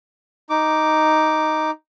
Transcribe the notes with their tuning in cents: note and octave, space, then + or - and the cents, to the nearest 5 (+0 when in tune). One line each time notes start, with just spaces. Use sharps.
D#4 +0 D6 +0